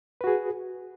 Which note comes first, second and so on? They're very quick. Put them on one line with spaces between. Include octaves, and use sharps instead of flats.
B4 F#4 G#4